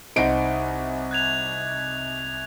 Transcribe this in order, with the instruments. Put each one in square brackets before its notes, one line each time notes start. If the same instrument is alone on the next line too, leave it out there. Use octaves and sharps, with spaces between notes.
[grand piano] C2 D#4 D7 [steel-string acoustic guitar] C5 D#5 F#5
[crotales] F#6 G#6 F7